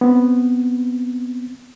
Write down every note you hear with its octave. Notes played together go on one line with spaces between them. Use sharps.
B3 C4